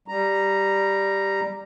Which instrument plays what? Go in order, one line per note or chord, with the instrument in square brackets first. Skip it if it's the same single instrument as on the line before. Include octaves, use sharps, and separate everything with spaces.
[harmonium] G3 A#5